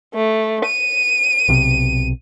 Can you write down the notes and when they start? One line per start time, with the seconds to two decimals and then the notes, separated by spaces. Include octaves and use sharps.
0.15 A3
0.66 D#7
1.49 B1 C3